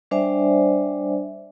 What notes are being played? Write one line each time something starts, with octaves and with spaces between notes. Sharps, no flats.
G3 D4 C5 D5 E5 G#5